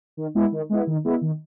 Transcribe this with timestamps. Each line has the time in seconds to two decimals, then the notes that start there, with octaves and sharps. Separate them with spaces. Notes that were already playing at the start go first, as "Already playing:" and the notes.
0.17 D#3
0.35 G#3 B3 E4
0.52 D#3
0.69 G#3 B3 E4
0.87 D#3
1.04 G#3 B3 E4
1.22 D#3